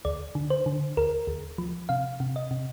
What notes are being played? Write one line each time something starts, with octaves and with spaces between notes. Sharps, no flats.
D2 D5
D3
C5
D3
D2 A#4
D2
F3
C3 F5
C3
D#5
C3